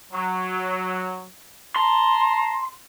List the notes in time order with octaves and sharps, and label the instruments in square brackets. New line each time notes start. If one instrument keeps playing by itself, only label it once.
[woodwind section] F#3
[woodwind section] A5 A#5 [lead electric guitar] C6